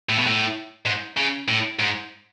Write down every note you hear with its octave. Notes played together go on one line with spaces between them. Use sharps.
A2
B2
A2
G#2
C#3
A2
G#2